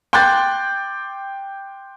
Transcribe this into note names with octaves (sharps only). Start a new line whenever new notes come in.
G5 C6 D6 F#6 G6 A6